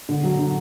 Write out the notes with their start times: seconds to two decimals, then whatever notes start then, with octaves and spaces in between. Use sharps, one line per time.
0.09 D3
0.23 F#3
0.39 D3